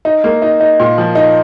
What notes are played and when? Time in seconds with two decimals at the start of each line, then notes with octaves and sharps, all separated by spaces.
0.05 D#4
0.24 A#3
0.42 D#4
0.60 D#4
0.80 A#2
0.98 F3
1.15 D#4